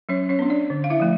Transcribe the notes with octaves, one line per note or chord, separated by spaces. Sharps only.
F#3 C#4 C#5
C#4 C#5
B3 D4
D4 D5
D3
F5
E4 E5
F3 A3